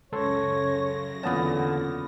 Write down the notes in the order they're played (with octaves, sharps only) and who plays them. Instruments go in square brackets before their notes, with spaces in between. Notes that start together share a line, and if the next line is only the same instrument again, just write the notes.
[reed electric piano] C#2 A4 C6 [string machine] F#2 C#3 A#6 [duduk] C#5
[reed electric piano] E2 C#4 [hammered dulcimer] A#2 B3 A5 [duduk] D3